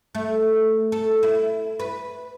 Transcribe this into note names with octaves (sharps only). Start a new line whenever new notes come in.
A3
A4
E4
B4